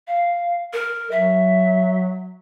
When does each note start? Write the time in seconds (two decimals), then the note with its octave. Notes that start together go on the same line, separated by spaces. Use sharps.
0.08 F5
0.73 A#4
1.11 F#3 E5